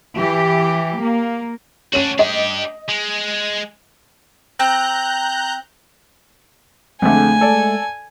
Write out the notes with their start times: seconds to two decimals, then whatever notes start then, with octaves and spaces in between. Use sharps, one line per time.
0.16 E3 G4
0.99 A#3
1.93 C#4 D4 F#4 D#7
2.19 D4 G4 D#5
2.89 G#3
4.59 C4 A#5 F#6 G6
7.02 F2 D3 G#3 A3 G#5
7.41 A4 D5